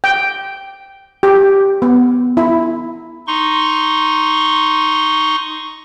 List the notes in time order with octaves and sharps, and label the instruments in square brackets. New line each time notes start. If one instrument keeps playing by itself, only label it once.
[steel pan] G5
G4
B3
E4
[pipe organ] D#4 C6 C#6